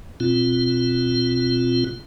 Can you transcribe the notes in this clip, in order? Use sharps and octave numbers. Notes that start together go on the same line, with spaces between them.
B2 C4 F4